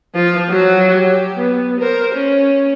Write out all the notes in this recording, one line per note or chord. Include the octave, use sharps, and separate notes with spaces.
F3 F4
F#3 F#4
G4
B3
A#4 C5
C#4